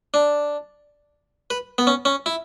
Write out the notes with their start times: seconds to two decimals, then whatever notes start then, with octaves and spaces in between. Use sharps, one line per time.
0.14 D4
1.50 B4
1.78 B3
1.87 C#4
2.05 C#4
2.26 E4